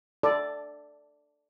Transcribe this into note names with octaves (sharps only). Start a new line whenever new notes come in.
A4 D5